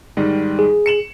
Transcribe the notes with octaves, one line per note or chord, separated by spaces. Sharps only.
G#2 D#3 G3
G#4
C#7 E7 F#7